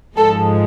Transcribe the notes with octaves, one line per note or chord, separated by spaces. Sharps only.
G#2 F3 G#3 A4